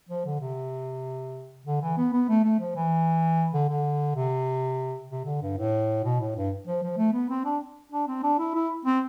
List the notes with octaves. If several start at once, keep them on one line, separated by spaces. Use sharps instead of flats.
F3
D3
C3
D3
E3
B3
B3
A3
A3
F3
E3
D3
D3
C3
C3
D3
G2
A2
B2
A2
G2
F3
F3
A3
B3
C4
D4
D4
C4
D4
E4
E4
C4